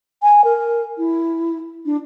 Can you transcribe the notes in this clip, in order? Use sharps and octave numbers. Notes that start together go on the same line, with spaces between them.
G#5
A#4
E4
D4